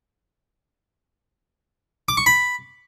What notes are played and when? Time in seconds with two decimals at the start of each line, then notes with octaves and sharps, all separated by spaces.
2.08 D6
2.17 C#6
2.26 B5